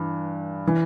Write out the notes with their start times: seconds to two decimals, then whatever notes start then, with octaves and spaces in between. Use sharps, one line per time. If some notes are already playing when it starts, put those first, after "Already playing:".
Already playing: G2 E3
0.67 E3